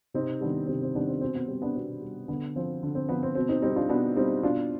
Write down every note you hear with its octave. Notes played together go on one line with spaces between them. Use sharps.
C3 C4 D#4
D#3 G3 B3 D4
C3 C4
C4
D#3 G3 B3 D4
C4
B2 C4
B3
G3 C4
B3 D4
B2 C4
G3
D3 B3
F3 C4
D3
C4
F3 B3
C4
B2 C4
C4 D#4
G3 C4 D#4
D4 F4
B2 B3 D4
G3 C4 D#4
B2 D4 F4